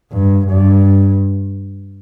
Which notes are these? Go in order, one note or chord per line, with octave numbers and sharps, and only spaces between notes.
G2
G2